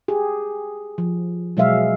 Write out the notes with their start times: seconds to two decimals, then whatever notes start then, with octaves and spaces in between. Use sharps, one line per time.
0.08 G4 G#4
0.98 F3
1.57 B2 F#3 G#3 G#4 E5 F5